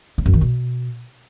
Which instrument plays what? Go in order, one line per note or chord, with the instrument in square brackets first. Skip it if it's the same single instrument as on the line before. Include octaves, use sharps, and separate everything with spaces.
[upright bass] C#3
F#2
D#3
B2